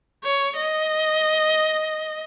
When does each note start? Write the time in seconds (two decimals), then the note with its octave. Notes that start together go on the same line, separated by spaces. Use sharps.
0.24 C#5
0.56 D#5